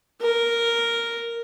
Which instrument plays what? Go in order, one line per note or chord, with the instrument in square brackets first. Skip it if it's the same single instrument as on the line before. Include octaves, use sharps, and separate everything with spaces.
[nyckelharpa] A#4